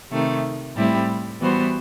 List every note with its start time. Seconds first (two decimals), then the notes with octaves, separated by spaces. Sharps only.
0.12 C3 D#3 A3
0.76 A2 G3 C4 E4 G4
1.40 E3 G3 B3 F#4 C5